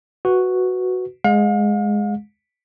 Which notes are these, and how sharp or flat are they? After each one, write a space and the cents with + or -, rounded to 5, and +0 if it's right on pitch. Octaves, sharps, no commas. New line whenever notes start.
F#4 +0 B4 +0
G#3 +0 F5 +40